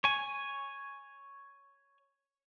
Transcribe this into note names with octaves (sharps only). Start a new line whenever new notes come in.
C#5 G#5